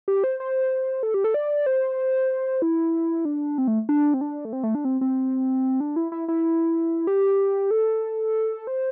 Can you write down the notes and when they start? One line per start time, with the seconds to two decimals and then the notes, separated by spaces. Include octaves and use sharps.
0.08 G4
0.24 C5
0.40 C5
1.03 A4
1.14 G4
1.24 A4
1.34 D5
1.66 C5
2.62 E4
3.25 D4
3.58 C4
3.68 A3
3.89 D4
4.14 C4
4.21 D4
4.45 A3
4.53 C4
4.63 A3
4.75 D4
4.85 C4
5.01 C4
5.80 D4
5.96 E4
6.12 E4
6.28 E4
7.07 G4
7.71 A4
8.67 C5